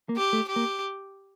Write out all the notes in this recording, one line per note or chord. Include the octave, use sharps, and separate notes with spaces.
A#3
G4
A3
G4
A#3